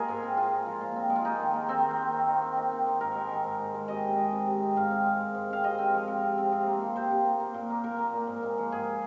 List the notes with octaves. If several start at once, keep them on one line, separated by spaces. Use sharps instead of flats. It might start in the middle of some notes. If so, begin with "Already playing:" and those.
Already playing: G#3 A#3 F4 G#4 A#4
G#2
C4
C4 F4
G#3
F3
A#2
C4
G#3
F4
A#3 D#4
D#3
A#3
D#3 C4
A#3
C5
D#3
C4
D#3
C4
D#3
C4
D#3
G#2 A#4
G#3
D#3
G#2
G#2
G#3
C3 D#5
C4
G#3
C3
C3
C4
G#2 F5
C4
G#3
G#2
G#2
C4 F5
C3 D#5
C4
F3
C3
C3
C4
C3
A#3
F3
C3 C5
C3
A#3
A#3
A#2
A#3
A#2 A#4
A#3
A#2
G#2
G#3
F3
G#2 G#4